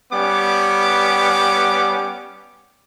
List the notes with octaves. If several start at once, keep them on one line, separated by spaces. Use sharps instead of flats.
G3 B3 C#4 D6